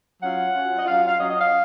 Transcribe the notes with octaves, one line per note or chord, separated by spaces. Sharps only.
F#3 C#4 F4 F#5
F#3 C#4 F4
D#5
F#3 C#4 F4 F5
F5
F#3 C#4 F4 D#5
D#5
F5